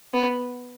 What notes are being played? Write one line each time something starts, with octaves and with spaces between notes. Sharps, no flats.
B3